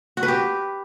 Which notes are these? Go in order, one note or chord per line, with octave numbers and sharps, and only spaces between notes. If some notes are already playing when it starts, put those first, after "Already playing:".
F#4
B4
G4